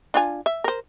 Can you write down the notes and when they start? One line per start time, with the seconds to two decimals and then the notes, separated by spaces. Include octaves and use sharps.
0.14 D4 F4 G#5
0.46 E5
0.64 A#4 C5